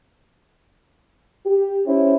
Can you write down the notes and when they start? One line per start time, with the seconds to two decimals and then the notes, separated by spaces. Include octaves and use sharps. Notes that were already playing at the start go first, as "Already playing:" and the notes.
1.46 G4
1.86 C#4 E4 G4 C5